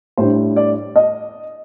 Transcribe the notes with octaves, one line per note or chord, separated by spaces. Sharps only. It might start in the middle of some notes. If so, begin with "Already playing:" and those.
A2 G3 D4 C5
D5
D#5